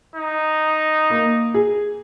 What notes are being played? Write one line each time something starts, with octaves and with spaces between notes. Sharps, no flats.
D#4
A#3
G#4